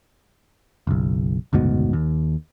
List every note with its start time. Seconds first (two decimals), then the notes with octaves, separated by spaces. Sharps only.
0.87 F#1 B1
1.53 F#1 D2 G#2 B2
1.93 D#2